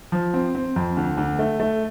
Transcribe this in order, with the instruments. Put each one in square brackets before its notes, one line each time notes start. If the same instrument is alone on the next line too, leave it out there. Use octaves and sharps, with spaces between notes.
[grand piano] F3
C4
C4
F2
D2
D2
A3
A3